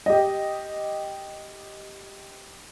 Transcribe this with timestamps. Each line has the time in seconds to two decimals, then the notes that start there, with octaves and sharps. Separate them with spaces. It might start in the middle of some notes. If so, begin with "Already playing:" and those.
0.06 G4 D#5